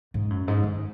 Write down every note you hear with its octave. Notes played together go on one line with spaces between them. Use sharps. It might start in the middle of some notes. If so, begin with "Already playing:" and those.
G#2
F#2
G#2
D#3